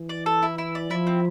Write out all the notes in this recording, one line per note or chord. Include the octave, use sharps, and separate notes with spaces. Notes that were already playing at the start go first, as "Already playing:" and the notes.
Already playing: E3
D5
A4
E4
E4
D5
F3 E4
C4